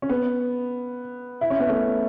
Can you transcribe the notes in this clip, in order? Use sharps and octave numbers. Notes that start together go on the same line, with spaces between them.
C#4
B3
E4
C#4
B3
A3 C#4